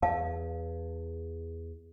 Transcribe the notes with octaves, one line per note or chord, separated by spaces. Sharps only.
E2 F5 A5